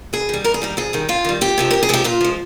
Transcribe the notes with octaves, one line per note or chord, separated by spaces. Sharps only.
G2 G#4
D#3 G3
G2 A#4
G#4
D#3 G3 A#4
F2 G#4
D#3 G3
F2 F4
D#3 G3
F2 G4
C3 F3 G#3
F2 A#4
G#4
C3 F3 G#3 G4
A#2 F4
F3 G#3